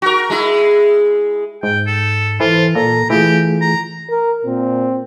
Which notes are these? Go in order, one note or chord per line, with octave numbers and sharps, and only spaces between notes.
F#4 A#4
G#3 E4
G#2 G5
A4
E3 F4 A4 C5
A#2 A4 A#5
E3 A3 F4 G4 G#4
A#5
A#4
A#2 C4